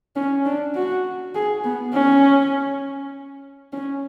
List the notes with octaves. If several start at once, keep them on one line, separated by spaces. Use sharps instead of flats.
C#4
D4
F#4
G#4
B3
C#4
C#4